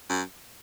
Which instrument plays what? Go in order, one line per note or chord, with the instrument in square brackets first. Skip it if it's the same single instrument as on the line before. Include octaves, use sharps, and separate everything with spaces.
[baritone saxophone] F#2